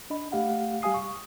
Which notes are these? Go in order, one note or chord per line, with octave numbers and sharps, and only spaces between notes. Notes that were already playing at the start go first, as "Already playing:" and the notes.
D4 D#5 B5
A3 G4 F5 F#5
G3 G4 F5 G#5 D#6 C7
C#6